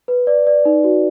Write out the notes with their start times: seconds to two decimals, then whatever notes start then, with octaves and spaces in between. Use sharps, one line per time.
0.08 B4
0.27 D5
0.47 D5
0.65 D#4
0.84 F#4